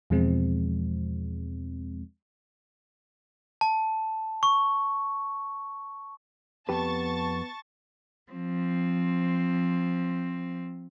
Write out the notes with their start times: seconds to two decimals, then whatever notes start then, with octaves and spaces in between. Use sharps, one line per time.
0.10 E2 B2 F3 G#3 C4
3.61 A5
4.43 C#6
6.69 F2 B3 G4 B4 A5 C#6 A6
8.32 F3 C4